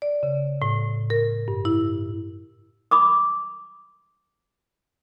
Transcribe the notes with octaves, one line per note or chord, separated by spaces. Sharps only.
D5
C#3
A2
A#4
G2
E4
B5 D6 D#6